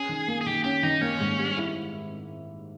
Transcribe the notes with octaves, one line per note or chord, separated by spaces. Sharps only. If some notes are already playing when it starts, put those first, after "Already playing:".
Already playing: C#4 G#4
D#3
A#3
G#4
D#3 G4
C#4 G4
D#3 D#4
A#3 C#4
G#2
G3
E4